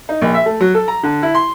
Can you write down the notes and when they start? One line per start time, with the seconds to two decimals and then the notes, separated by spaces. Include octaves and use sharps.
0.09 D#4
0.22 A#1
0.34 E5
0.46 A3
0.61 F#3
0.74 A4
0.88 A#5
1.03 D3
1.23 E4
1.35 C6